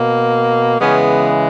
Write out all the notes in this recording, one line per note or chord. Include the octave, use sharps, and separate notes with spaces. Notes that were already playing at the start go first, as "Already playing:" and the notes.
Already playing: B2 A#3
C#3 E3 G#3 B3 C#4